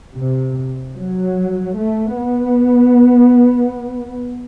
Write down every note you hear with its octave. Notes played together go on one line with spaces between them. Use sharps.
C3
F#3
A3
B3